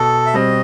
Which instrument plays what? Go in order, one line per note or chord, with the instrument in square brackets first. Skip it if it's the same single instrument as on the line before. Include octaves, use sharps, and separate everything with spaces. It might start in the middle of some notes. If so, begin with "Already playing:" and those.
Already playing: [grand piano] B2 [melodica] A4
[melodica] E5
[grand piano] G3 C4 [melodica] D#5